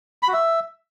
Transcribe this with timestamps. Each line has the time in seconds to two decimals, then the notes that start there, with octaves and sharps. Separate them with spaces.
0.23 B5
0.28 F#4
0.33 E5